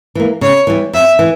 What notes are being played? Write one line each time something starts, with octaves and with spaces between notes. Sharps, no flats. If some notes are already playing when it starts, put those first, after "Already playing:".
E3 A#3
C#3 C#5
E3 G3
F2 E5
E3